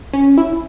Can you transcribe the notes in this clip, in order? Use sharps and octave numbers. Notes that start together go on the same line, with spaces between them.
C#4
E4